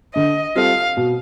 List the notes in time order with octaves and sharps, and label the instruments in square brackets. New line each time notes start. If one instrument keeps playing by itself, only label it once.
[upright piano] D3 [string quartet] D#5
[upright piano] G3 C4 F4 A4 [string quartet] F5
[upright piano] B2